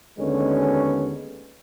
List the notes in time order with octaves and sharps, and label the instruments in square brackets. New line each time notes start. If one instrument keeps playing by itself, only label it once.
[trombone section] D#2 D3 G#3 B3 C#4